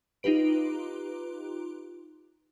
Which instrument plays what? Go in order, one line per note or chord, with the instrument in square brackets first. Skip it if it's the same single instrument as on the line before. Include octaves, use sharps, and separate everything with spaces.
[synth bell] D#4 F4 G4 B4 D7